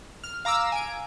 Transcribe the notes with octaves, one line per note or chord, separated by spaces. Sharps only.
F6
F5 A#5 D6 E6
G#5 D7